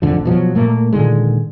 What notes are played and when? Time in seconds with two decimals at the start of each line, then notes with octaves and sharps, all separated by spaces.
0.02 A1 F2 D3 F3
0.25 B2 F3 F#3
0.55 A#2 A3 A#3
0.92 A#2 D3 D#3 G#3